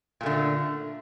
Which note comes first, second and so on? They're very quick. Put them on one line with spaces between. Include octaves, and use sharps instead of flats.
A#2 A3 D3